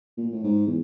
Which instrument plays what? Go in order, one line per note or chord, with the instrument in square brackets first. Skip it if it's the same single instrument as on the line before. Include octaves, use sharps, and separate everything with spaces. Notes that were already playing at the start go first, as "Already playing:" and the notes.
[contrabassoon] A#2
A2
G#2
E2